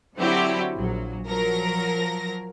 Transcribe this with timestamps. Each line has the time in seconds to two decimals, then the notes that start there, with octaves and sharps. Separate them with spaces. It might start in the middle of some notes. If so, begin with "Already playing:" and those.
0.17 D3 F#3 C4 E4 F#4 G4
0.76 A#1 F#3
1.28 F3 F#3 A#4 A#6